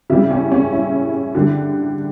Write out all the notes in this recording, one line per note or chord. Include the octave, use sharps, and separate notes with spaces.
C#3 G3 E4
C#4
C#4
E4
D3 G3